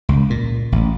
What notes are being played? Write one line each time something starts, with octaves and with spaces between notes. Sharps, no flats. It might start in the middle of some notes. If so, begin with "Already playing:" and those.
C#2
A#2
A1